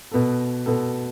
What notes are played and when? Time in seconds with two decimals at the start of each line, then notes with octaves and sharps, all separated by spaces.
0.12 B2 B3 A4
0.66 B2 B3 A4